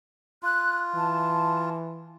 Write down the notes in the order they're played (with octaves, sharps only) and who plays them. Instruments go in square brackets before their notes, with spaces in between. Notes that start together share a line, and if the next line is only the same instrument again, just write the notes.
[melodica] F4 [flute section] F#6
[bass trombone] E3 [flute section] A5